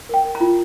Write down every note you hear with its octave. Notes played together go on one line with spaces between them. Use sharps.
A#4 G5
A#4
A#5
F4